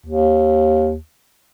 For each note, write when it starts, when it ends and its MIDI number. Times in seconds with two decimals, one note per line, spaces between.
0.06 0.96 39